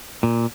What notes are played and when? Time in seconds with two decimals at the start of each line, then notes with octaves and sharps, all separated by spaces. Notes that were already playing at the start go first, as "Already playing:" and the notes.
0.23 A#2